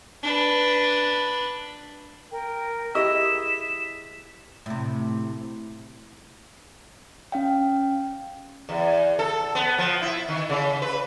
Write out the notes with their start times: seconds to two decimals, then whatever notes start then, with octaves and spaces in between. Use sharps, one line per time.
0.23 D4 B4
2.31 A#4 G5
2.95 E4 G4 G#4 D#5 E6 B6 E7
4.66 A2 C3
7.32 C#4 F5 G5
8.69 E2
9.19 A4
9.55 B3
9.78 F3
10.02 E4
10.29 D#3
10.49 C#3
10.82 B4